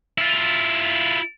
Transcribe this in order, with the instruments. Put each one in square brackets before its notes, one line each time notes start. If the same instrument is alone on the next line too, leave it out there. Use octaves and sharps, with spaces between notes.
[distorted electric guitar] E4 F4